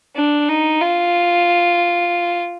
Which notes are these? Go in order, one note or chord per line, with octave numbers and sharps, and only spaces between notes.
D4
D#4
F4